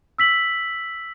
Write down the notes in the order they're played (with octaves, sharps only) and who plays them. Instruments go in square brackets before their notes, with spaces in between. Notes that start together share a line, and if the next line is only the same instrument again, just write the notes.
[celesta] E6 B6 F#7